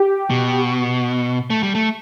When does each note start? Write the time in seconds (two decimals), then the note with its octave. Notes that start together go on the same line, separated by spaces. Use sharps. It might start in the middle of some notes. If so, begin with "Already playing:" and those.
Already playing: G4
0.30 B2
1.50 A3
1.63 G3
1.75 A3